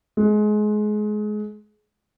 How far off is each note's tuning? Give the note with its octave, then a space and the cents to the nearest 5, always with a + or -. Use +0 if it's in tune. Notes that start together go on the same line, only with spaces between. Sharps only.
G#3 +25